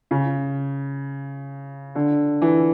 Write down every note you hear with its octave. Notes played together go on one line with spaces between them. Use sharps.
C#3
D3
E3